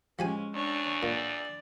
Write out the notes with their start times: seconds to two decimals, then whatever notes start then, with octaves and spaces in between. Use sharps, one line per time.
0.19 F3 G#3 C#4 G4 G#5
0.54 E2 D4 C#5
1.03 A#2 D5